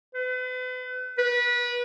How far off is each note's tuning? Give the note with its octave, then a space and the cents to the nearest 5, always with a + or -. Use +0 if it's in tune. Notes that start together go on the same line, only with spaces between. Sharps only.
B4 +40
B4 -25